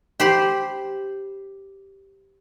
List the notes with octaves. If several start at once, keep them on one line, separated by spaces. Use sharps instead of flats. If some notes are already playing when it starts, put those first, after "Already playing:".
G4 C5 B5